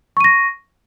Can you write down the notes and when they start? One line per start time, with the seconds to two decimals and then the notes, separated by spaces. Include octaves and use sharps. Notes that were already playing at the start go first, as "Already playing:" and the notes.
0.17 C#6
0.21 D#7
0.24 A#6